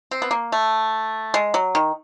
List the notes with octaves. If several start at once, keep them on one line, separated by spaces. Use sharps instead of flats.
C4
B3
A#3
A3
G#3
F#3
D#3